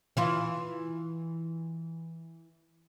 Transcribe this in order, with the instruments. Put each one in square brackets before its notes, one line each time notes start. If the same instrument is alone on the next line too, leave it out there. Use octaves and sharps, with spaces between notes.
[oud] E3 E4 F4